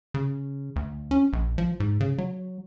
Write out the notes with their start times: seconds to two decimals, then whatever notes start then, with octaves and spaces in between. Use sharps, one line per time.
0.14 C#3
0.76 D2
1.11 C#4
1.33 A#1
1.58 F3
1.80 G#2
2.00 C#3
2.18 F#3